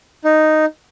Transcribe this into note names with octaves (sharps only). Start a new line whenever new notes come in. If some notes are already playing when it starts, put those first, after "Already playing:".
D#4